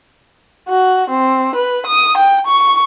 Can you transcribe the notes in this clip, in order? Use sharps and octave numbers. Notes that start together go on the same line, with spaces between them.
F#4
C4
B4
D#6
G5
C#6